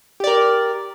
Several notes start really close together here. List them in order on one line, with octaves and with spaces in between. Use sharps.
G4 D5 A#4